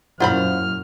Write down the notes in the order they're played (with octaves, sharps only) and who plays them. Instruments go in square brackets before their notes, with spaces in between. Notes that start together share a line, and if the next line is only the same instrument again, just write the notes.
[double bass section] F#2 A#2 [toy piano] E4 F#5 [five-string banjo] F4 C5 B5 [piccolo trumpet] F6